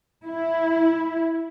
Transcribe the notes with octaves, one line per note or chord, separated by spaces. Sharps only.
E4